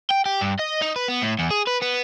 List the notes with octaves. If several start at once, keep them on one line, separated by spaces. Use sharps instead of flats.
G5
G4
G2
D#5
D#4
B4
B3
A2
E2
G#4
B4
B3